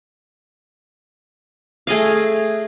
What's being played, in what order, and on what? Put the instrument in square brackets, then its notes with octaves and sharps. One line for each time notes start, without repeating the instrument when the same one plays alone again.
[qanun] A3 G#4 D#5 F5